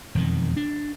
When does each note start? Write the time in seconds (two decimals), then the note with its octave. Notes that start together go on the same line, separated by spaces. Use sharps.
0.15 E1 F2 D#3
0.56 D4